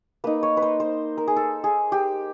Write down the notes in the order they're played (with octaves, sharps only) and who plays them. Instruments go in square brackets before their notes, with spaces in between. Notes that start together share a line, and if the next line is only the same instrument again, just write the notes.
[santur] A#3 D#4 B4
C#5
B4
C5
C5
A#4
G#4
A4
G#4
G4